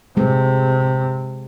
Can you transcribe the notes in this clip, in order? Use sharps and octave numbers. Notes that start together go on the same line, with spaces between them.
C3 G#3